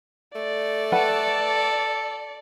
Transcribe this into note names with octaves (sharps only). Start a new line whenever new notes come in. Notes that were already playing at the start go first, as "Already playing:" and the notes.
A3 D5
A4 B4 F#5 B5